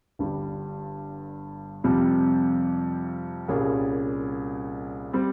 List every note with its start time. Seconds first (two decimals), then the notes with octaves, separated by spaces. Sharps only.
0.19 G1 G2 G3
1.84 F2 C3 G3 C4
3.48 C2 A#2 G3 C#4 G#4
5.13 G3 C4